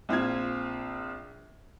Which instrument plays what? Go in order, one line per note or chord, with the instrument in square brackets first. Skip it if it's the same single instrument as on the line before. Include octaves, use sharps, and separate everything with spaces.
[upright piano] A#1 C4 F4 G#6